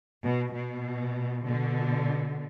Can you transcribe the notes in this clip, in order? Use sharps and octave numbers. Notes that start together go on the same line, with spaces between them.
B2
B2
B2 D3